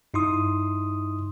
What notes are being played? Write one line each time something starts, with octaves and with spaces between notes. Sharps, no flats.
G2 D#4 E4 C6 D#6